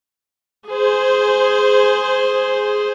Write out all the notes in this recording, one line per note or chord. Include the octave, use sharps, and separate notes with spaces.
G#4 C5